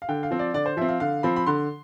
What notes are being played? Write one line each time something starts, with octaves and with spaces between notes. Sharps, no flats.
F5
D3 G5
F5
F3 C4
D5
D3 D5
C5
F3 C4 E5
F5
D3 F5
F3 C4 B5
B5
D3 C6